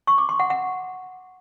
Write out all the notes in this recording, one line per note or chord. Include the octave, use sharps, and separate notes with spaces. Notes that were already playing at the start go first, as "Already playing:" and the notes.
C#6
D6
C6
F#5
F#5